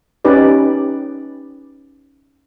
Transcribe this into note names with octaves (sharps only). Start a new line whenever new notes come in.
C#4 D#4 G4 B4 D5